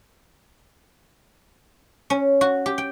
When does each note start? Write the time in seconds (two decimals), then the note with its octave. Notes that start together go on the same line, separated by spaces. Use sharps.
2.10 C#4
2.41 F#4
2.66 G4
2.78 G5